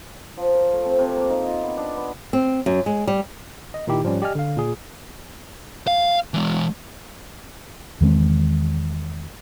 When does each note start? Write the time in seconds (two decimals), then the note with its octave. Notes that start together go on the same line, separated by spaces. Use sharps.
0.37 F3
0.55 A#4
0.73 A3
0.85 C4
0.99 C3
1.17 A#3
1.30 D#4
1.47 F4
1.63 B3
1.77 D4
1.97 B3
2.33 C4
2.66 F#2
2.86 G#3
3.07 G3
3.74 D#5
3.87 A#2 D#3 D#4 E4 G4
4.03 G#2 F3 G3 C#4
4.22 G4 D5 D#5 G#5 F6
4.35 D3 F5
4.57 A#2 G#4
5.87 F5
6.34 E3 G#3
8.01 E2 D#3 G#3 C4